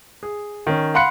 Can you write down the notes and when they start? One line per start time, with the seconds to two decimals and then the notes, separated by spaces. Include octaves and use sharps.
0.23 G#4
0.67 D#3 C#4
0.94 F5 F#5 B5 C6 F#6 C#7